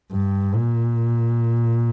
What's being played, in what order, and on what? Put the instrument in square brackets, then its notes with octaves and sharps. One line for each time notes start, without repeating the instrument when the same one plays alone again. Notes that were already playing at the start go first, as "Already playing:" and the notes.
[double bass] G2
A#2